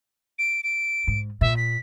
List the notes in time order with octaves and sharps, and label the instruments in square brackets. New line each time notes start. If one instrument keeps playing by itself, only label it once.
[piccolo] D7
D7
[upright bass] G#2
[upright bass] A#2 [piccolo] E5
[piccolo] B6